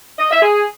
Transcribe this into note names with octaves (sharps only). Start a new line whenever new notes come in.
D#5
E5
G#4